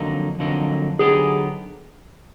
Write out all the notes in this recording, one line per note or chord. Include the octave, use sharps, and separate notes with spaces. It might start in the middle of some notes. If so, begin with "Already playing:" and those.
Already playing: F2 D3 F#3 A#3 D#4
F2 D3 F#3 A#3 D#4
D3 F#3 B3 D#4 G4 G#4